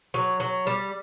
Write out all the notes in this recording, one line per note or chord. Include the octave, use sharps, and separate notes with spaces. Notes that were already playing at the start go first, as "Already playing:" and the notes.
F#3
F#3
G3